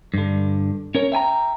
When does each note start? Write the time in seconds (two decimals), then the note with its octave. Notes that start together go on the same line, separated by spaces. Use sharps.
0.14 G2 D3
0.95 C#4 A#4 C#5
1.12 E5 G5 G#5 A#5